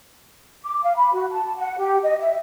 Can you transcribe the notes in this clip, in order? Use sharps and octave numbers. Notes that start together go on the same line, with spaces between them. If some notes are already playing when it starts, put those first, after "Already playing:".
D6
F5
B5
F#4
A5
F#5
G4
D#5
E5